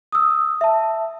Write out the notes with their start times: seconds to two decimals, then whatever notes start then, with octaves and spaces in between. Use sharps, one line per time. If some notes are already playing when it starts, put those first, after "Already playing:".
0.12 D#6 E6
0.61 E5 A5